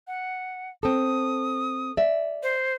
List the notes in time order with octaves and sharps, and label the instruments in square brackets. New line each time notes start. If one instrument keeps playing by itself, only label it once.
[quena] F#5
[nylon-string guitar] C4 A4 [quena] D#6
[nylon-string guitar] D5 E5
[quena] C5